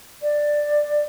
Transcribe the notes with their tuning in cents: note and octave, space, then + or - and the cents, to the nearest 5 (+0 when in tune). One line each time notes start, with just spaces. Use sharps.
D5 +10